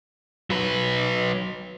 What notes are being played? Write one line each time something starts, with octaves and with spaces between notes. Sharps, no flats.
F#3 B4